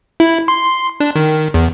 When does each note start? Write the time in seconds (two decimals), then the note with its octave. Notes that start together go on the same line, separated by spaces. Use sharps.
0.20 E4
0.48 C6
1.00 D4
1.16 D#3
1.54 E2